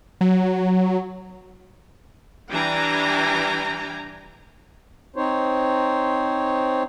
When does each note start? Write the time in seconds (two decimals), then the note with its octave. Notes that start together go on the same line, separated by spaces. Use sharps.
0.21 F#3
2.50 E3 G3 D4 G5 G#5 A#5
5.16 C4 D#4 C5 C#5